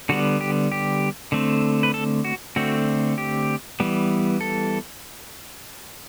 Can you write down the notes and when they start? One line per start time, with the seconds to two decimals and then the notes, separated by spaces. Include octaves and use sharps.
0.09 D3 G3 B3 F#4
0.41 G4
0.72 G4
1.32 D3 A3 C4
1.83 B4
1.94 A4
2.25 F#4
2.56 D3 A3 C4 F#4
3.18 G4
3.80 E3 G3 B3
4.41 A4